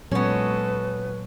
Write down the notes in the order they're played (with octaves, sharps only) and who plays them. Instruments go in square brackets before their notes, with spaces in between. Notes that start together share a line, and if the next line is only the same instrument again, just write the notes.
[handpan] A#2 F#3 C#5 [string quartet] G#3 A4 [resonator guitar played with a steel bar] B3 C#4 [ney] B4